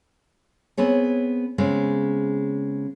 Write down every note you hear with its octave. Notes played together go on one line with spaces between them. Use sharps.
B3 C4 G#4 C#5
C#3 G#3 B3 C4